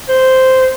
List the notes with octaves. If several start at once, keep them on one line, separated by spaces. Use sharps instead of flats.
C5